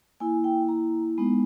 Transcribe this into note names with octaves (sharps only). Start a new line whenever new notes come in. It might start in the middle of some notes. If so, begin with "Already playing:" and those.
A#3 E4 G#5
G5
A#5
G#3 B3 D#4